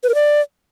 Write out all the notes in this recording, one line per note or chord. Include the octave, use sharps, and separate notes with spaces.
B4
A#4
D5